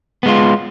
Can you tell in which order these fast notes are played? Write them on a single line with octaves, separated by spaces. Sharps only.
B3 G#3 F4